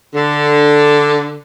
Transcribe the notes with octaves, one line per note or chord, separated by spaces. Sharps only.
D3